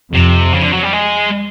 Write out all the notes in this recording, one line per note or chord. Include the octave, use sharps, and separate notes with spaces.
F2 C3
C#3
D3
F#3
G3
G#3